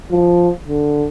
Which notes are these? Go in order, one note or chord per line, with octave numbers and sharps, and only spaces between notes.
F3
D3